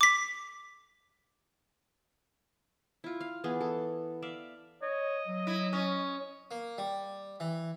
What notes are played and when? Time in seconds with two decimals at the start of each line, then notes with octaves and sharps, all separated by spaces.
0.01 D6 B6
3.04 E4 F4
3.21 F5
3.44 E3 B3 G#4
3.61 A4
4.22 D5 E5 F5
4.82 C#5 D#5
5.28 F#3
5.47 E4
5.73 C#4
6.51 A#3
6.78 G3
7.40 E3